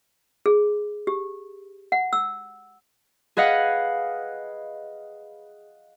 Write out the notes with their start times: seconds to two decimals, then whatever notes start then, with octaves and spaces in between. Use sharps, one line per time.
0.46 G#4
1.07 G4
1.92 F#5
2.13 E6
3.37 G#4 B4 D#5 F5 F#5